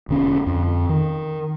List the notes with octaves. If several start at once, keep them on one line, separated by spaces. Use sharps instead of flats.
E1 D3 C#4
F2
D#3